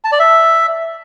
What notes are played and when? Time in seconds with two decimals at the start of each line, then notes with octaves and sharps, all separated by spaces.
0.05 A5
0.12 D5
0.20 E5